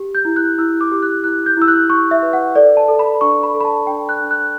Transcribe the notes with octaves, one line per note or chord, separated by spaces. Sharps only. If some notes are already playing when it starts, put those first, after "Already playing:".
Already playing: G4
G6
E4
F#6
E4 E6
D6
G4
F#6
E4 F#6
G6
E4 E6
F#6
G4 C#6
E5
B4
F#5
A4 D5
A5
A4
B5
D4 C#6
B5
A4
B5
A5
D4 G5
F#6
D4
F#6